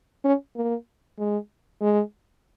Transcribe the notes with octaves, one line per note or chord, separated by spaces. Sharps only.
C#4
A#3
G#3
G#3